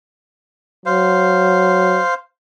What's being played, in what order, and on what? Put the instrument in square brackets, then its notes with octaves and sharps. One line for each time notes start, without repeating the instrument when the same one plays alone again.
[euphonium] F#3 [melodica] C5 F5